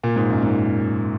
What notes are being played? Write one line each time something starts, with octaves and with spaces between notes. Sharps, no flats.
A#2
G#2
F#2
G#2